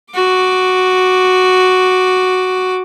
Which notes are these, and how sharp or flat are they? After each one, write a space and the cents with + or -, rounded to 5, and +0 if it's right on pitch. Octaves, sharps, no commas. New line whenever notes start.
F#4 +0 D6 +5